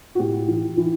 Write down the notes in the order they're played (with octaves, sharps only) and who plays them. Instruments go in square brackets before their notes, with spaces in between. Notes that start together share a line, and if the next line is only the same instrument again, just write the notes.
[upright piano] F#4
A2 G4
E3
E3